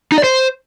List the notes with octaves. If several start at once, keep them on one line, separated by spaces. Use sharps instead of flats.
D#4
D5
C5